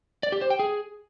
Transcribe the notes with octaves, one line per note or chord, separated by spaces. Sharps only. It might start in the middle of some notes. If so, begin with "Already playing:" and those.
D5
G4
C5
G5
G#4